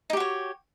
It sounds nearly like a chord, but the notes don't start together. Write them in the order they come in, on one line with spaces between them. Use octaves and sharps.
D#4 G4 F#4 C#5